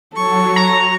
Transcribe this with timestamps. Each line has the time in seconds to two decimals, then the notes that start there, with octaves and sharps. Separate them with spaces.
0.16 F#3 A4 C#5 C#6
0.56 A#5